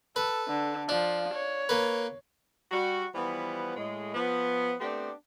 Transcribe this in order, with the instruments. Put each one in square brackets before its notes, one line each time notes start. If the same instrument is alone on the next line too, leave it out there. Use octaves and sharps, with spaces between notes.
[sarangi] A4 [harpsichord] B4
[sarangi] D3
[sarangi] F3 [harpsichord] D4
[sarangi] C#5
[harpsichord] A#3 B4
[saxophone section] G3 F#4
E3 F3 G3 B3
A2 G#3
F3 B3
A3 B3 C4 D4 G4